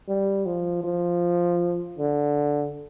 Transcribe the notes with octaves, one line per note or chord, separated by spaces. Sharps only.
G3
F3
F3
D3